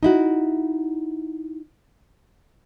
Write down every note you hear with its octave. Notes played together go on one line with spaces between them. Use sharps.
D#4 E4 F#4